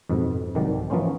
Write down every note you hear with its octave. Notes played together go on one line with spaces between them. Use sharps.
F2 G#2 B2
C2 G#2 D#3 F#3 D5 G5
E3 F3 A#3 B3 C#4 C5